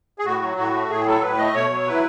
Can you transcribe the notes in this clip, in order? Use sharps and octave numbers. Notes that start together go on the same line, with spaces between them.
G#4
A2 F#4
F#3
A2 F#4
A3
A2 G#4
F#3 A4
A2 B4
A3 D#5
B2 C#5
F#3
E4 B4